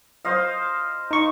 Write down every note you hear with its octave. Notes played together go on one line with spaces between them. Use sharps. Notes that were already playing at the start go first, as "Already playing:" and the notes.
C5 D#5 F5
D#4 C#6